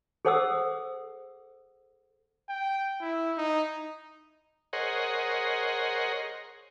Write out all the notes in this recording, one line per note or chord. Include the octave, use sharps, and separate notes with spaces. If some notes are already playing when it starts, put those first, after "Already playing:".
G#4 A4 C5 F#5 D#6 E6
G5
E4
D#4
G#4 A#4 C5 C#5 D#5 F#5